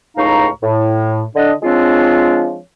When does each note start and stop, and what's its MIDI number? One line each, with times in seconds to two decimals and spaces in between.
0.17 0.48 37
0.17 0.48 45
0.17 0.48 63
0.17 0.48 77
0.17 0.48 82
0.17 0.48 85
0.63 1.24 45
1.35 1.52 50
1.35 1.52 62
1.35 1.52 75
1.63 2.59 53
1.63 2.59 56
1.63 2.59 60
1.63 2.59 62
1.63 2.59 65
1.63 2.59 73